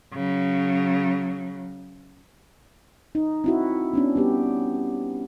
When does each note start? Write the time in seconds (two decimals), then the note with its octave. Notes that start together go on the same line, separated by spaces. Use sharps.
0.13 C#3 F#3
3.15 D#4
3.44 C4 E4 F#4
3.93 B3 C#4 D4
4.16 G3 B3 G4